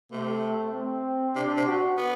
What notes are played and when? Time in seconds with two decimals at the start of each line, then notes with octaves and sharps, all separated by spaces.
0.12 C3 A3
0.74 C4
1.35 C3 D4
1.57 C3
1.66 F#4
1.98 B3